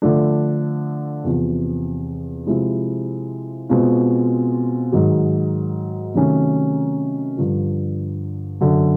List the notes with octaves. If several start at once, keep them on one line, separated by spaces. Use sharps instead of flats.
D3 F3 A3 D4
E2 C3 F3
C3 F3 G#3 C4 E4
B2 G#3 C4 F4
G#2 D#3 F#3
C3 D#3 F#3 A3 C#4
G2 D3 F3
F#2 D3 F#3